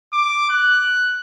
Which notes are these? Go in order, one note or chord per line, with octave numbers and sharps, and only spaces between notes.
D6
F#6